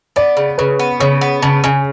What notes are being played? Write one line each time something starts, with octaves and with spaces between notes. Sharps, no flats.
B3 D5
C#3
C#3 B4
B3
C#3 C#5
B3
C#3 A5
C#3 G#5